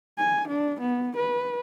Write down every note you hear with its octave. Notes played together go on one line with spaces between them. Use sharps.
G#5
D4
B3
B4